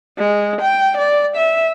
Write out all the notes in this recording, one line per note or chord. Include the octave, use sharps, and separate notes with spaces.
G#3
G5
D5
E5